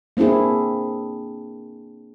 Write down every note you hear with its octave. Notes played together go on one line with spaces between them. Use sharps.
A#3 C4 D4 E4 G#4